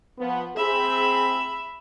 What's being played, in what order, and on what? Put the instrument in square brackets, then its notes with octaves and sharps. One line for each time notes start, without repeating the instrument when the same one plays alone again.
[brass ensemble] F3 B3
[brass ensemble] C4 G#4 [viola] E5 B5